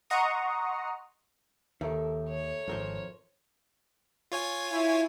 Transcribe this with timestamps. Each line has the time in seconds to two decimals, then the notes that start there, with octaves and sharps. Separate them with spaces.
0.10 D#5 F#5 A#5 C6 C#6 D#6
1.81 D#2 D#3 A4 A#4 E5
2.29 C#5
2.68 D1 G#1 F2 A#4 C5
4.32 F4 C#5 G#5
4.72 E4